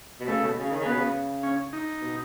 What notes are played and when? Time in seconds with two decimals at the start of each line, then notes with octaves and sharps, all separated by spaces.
0.20 B2
0.28 C#3 A3
0.42 B2
0.58 C#3
0.71 D#3
0.80 C#3
0.86 B2 B3
0.97 C#3
1.43 C#4
1.73 D#4
2.01 B2